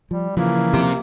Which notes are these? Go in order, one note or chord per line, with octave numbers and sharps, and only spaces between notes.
F3 G3
C#3 E3 F3 A#3
C3